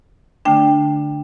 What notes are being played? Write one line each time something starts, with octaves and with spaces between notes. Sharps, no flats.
D3 A3 D4 G5